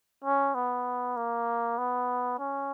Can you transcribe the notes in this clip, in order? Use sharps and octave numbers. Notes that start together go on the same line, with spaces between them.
C#4
B3
A#3
B3
C#4